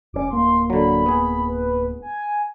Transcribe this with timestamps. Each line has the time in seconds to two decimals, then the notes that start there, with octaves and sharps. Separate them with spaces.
0.14 E1 C3 C#4 D6
0.30 D1 A#3 C6
0.70 D3 F#3 B5
1.06 B3 G#4
1.48 B4
2.02 G#5